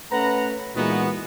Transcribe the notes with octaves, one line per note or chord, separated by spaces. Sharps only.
A3 C#4 B4 F#5 A#5
A#2 E3 G#3 B3 D#4 F#4